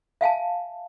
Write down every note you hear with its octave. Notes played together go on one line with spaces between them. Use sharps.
E5 F5 G#5 A5